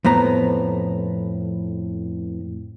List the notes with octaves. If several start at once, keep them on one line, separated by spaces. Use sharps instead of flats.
F2 A2 B3 A#5